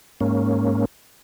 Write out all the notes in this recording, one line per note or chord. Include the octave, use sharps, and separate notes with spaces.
G#2 A#3 C#4